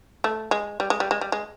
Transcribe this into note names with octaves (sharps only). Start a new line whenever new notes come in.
A3
G#3
G3
G#3
G3
G#3
G3
G#3